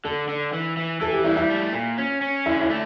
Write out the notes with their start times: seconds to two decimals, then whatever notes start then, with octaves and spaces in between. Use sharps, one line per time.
0.04 D3 A4
0.28 D3
0.53 E3
0.77 E3
1.01 E3 A4
1.13 G4
1.24 G3 E4
1.37 E4
1.50 A3
1.73 A#2
1.98 C#4
2.21 C#4
2.46 D3 E4
2.61 E4
2.70 A3